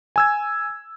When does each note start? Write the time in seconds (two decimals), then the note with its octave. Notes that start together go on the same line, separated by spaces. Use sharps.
0.16 G#5 E6 G#6